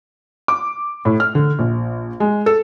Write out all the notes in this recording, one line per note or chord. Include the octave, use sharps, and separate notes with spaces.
D6
A2
F6
D3
A#1
G#3
A4